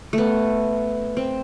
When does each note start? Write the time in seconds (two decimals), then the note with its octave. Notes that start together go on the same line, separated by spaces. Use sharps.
0.13 A3 B3
1.17 C4